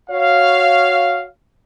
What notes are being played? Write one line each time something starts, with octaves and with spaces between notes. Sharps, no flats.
F#4 C#5 F5